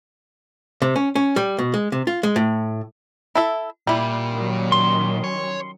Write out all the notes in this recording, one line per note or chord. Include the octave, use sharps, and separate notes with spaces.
C3
C#4
C#4
G3
B2
G#3
C3
F4
G#3
A2
E4 A4 E5
A#2 G3 E4
D#3 F#3 C#4
C6
C#5